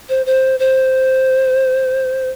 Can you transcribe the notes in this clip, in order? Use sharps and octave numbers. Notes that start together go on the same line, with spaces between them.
C5
C5
C5